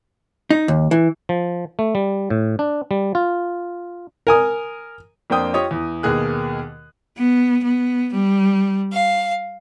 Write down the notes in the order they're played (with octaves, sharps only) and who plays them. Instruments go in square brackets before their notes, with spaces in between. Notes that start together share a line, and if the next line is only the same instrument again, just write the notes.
[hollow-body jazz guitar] D#4
D#2
E3
[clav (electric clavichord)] F3
A3
G3
A2
D4
G3
F4
[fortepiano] A#4 G#5 D#6
[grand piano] F2 A#3 D4 C5 G5 D#6
F4 G4 C#5 D#5 D#6
E2
D#2 B2 A#3 G#4 F#6
[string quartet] B3
B3
G3
F5